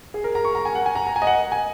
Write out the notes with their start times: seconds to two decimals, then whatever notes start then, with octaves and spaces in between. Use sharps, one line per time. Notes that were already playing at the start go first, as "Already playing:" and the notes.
0.14 G#4
0.24 A#4
0.35 A#5
0.45 C#6
0.55 A#5
0.65 G#5
0.75 F#5
0.86 G#5
0.95 A#5
1.07 A#5
1.16 G#5
1.22 D#5
1.27 F#5
1.52 G#5